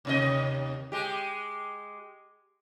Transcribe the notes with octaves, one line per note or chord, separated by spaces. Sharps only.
D#2 C3 D#5
G#3 G4